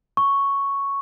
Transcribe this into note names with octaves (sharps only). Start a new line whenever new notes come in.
C#6